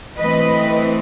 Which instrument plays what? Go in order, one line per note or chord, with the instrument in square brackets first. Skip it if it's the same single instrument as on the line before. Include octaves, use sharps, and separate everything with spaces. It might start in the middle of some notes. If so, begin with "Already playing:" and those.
[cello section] E3 A3 C4 B4 D#5